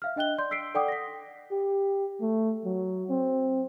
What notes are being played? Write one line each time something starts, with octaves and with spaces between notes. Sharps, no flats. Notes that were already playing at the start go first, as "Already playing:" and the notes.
E5 F5 F6
D4 D#5 G5 F#6 G7
D5 C6 G6
E6 B6 C7 D7
A4 D5 F#5 G5 D6 D#6
A#6 B6
G4
A3
F#3
C4